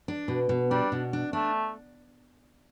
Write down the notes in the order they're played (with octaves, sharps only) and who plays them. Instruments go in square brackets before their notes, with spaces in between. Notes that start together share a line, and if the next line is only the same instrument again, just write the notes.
[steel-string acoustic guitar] D4
B2
B2
[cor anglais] G3 [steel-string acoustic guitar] D4
[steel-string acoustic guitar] B2
D4
[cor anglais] A3 [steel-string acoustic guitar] D4